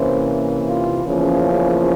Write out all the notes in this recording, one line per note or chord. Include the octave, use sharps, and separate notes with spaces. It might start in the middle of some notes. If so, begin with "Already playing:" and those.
Already playing: C3 E3 A#3 C#4 C5
F4
E2 C#3 F3 A#3 C#4